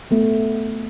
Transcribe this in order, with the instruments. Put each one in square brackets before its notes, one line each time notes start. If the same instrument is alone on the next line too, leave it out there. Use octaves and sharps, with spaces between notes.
[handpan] A3 B3